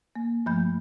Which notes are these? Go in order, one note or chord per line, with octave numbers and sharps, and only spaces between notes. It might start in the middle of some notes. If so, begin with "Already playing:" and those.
A#3
G2 F3 A3 B5 G6